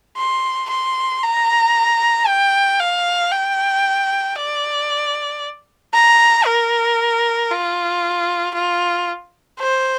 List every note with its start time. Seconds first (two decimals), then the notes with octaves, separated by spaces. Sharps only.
0.17 C6
0.69 C6
1.23 A#5
2.26 G5
2.80 F5
3.32 G5
4.36 D5
5.94 A#5
6.46 A#4
7.50 F4
8.54 F4
9.59 C5